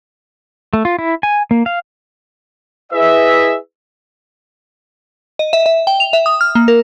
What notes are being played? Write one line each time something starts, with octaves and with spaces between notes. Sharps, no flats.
A3
F4
E4
G#5
A#3
F5
E4 G#4 B4 D#5 E5
D#5
E5
E5
G5
F7
E5
D#6
F6
A#3
A#4